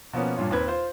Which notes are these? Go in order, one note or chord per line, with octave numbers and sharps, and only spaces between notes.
B2 F3 A#3 B3 C#4
G2 A#2 F4 C#5
D#2 C4 B4 G#6
F4 C5